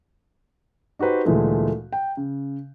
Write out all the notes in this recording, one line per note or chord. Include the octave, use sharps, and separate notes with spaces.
D#4 F#4 G4 B4 C5
D2 A#2 E3 G#3 A3
G5
C#3